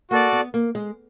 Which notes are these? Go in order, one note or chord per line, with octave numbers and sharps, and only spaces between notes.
A#3 F#4 A4 D5
B3
A#3
G#3